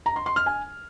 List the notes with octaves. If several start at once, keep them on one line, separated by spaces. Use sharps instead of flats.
A#5
C6
C6
F6
G#5